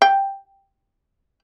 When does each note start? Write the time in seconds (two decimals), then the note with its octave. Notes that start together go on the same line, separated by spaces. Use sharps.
0.02 G5